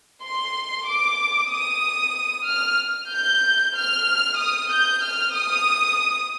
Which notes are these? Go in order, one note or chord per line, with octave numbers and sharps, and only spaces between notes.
C6
D6
D#6
F6
G6
F6
D#6
G6
F6
D#6